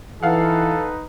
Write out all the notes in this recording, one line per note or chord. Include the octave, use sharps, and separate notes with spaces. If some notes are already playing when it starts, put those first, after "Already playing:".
E3 D#4 A4 B4 F5 F#5